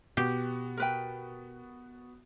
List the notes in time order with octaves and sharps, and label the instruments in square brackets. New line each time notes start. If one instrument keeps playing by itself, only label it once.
[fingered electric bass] B2 [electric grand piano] B3 F#4 [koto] G4
[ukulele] A#4 B4 G5